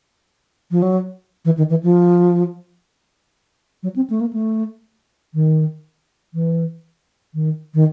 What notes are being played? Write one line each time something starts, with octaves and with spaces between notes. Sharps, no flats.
F3
F#3
E3
D#3
E3
F3
F#3
C4
A3
A#3
A3
D#3
E3
D#3
D#3